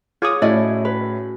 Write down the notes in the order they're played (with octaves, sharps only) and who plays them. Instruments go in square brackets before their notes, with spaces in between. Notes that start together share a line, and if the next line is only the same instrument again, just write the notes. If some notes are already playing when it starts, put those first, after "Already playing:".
[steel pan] F4 D6 D#6 [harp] G#4 C#5
[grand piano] A2 [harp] A3 C#4 F#4 [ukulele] E4 D5 D#5
[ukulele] B4